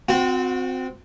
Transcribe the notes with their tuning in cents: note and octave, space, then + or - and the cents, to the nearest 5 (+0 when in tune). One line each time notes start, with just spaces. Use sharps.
C4 -15 F#4 -35 F#5 +5